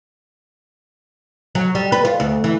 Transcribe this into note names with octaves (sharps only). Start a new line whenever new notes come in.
F#3
G3
B4
F4
D2
E3